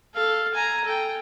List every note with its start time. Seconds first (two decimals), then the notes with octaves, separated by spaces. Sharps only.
0.14 A4 F5
0.54 G#5 A#5
0.85 A4 G5